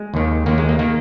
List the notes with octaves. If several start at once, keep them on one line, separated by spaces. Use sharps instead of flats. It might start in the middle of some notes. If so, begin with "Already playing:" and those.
Already playing: G#3
D#2 D#3
D#2 D#3 A#3
G#3
A#3
D#3 A#3